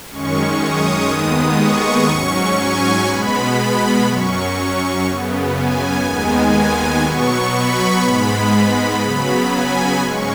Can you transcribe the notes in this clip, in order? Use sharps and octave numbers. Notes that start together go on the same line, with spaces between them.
F#2 D#3 G#3 C#4 C#6
D#6
D#2 D#3 G#3 B3
C#6
G#2 F#3 C#4
G#5
B2 G#3 B3 B5
F#2 F#3 C#4 C#6
F#2 C#3 B3
G#5
D#2 D#3 G#3 B3
G#5
B2 F#3 B3 C#6
B5
G#2 G#3 B3
C#3 F#3 B3 B5
G#5
G#2 G#3 C#4 C#6